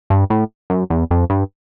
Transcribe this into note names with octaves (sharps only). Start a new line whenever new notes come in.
G2
A2
F#2
E2
F2
G2